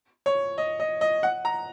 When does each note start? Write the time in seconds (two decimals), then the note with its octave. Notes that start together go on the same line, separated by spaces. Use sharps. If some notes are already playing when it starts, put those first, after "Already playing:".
0.26 C#5
0.58 D#5
0.80 D#5
1.01 D#5
1.23 F#5
1.45 A#5